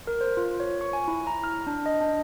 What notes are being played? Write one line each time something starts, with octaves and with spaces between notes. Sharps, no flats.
A#4
C5
F4
C#5
C#6
G#5
E4
A#5
F6
D4
D#5
D4